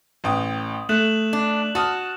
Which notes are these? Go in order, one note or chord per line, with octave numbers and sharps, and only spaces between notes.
A1 G5 D#6
A3 F#6 E7 F#7
D4
F#4 A5 D#6 F6